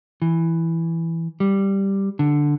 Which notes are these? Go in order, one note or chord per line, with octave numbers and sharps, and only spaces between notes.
E3
G3
D3